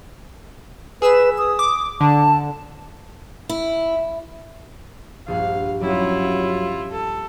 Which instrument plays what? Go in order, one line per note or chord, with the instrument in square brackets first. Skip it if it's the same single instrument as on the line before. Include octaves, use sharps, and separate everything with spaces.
[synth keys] G#4 E6 E7 [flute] B4
[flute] D#6
[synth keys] D6
[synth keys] D3 [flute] A5
[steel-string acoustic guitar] E4
[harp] A#1 G2 F#5 [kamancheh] F5
[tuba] F#3 [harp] G3 C#4 [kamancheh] E4 F4
[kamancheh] A4